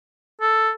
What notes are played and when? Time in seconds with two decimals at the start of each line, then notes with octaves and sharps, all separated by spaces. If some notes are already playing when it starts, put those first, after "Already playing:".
0.41 A4